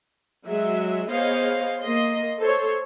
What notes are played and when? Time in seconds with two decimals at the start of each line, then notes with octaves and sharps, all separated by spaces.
0.46 F#3 G#3 F#4 E5
1.10 B3 G#4 C5 C#5 D#5 F5
1.80 A#3 D#5 C6
2.38 A4 C5 C#5